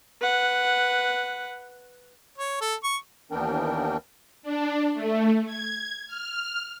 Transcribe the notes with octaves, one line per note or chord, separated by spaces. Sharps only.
B4 F#5
C#5
A4
C#6
D#2 E3 B3 D4 A#4 G5
D4
A3
G#6
F6